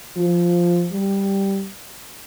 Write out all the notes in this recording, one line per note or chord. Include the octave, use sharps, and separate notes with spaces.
F3
G3